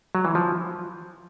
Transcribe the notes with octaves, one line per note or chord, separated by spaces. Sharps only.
F#3
E3
F3